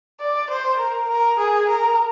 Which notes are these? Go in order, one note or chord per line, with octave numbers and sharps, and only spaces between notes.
D5
C5
A#4
A#4
G#4
A#4